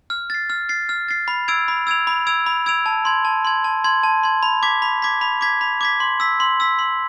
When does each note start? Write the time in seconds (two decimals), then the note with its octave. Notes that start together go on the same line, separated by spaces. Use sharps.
0.10 F6
0.30 A6 C7
0.50 F6
0.69 A6 C7
0.89 F6
1.08 A6 C7
1.28 B5
1.48 E6 G#6 D7 F7
1.68 B5
1.87 E6 G#6 D7 F7
2.07 B5
2.27 E6 G#6 D7 F7
2.46 B5
2.66 E6 G#6 D7 F7
2.86 A5
3.05 C6 G#6
3.25 A5
3.45 C6 G#6
3.64 A5
3.84 C6 G#6
4.03 A5
4.23 C6 G#6
4.43 B5
4.63 D6 G#6 B6
4.82 B5
5.02 D6 G#6 B6
5.21 B5
5.41 D6 G#6 B6
5.61 B5
5.81 D6 G#6 B6
6.00 C6
6.20 E6 B6
6.40 C6
6.60 E6 B6
6.79 C6